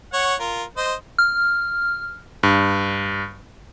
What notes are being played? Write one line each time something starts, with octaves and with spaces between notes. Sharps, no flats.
C#5 F#5
F4 A#4
C5 D#5
F6
G2